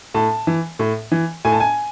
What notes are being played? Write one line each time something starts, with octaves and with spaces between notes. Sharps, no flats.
A2 A5
E3
A2
E3
A2 G#5
A5
G#5